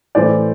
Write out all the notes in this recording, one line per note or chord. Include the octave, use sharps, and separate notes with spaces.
A2 E3 A3 C5 D5